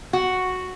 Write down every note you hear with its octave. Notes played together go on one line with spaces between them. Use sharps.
F#4